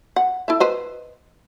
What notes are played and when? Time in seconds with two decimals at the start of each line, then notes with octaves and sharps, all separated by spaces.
0.16 F#5
0.48 E4 A4 E5
0.60 B4 C5 D#5